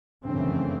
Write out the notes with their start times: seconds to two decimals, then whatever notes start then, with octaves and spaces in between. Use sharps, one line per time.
0.25 G2 C#3 E3 A3 C4
0.36 F#2
0.46 F2